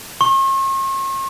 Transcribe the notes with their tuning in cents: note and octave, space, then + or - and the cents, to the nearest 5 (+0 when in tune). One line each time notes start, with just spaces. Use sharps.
C#6 -45